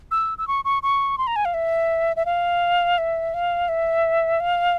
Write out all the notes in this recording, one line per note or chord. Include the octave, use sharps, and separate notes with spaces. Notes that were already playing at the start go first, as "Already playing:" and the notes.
E6
E6
C#6
C#6
C#6
C6
A#5
G#5
F5
E5
E5
F5
E5
F5
E5
F5